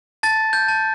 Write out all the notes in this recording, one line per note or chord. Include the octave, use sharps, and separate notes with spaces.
A5 A6
G6
A5